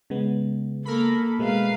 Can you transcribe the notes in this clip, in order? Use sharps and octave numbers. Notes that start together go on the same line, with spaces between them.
C#3 G#3 B3
A#3 A4 A#4 B5
B2 G#3 A3 B4 F5